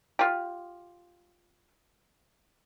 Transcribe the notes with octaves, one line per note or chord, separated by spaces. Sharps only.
F4 G4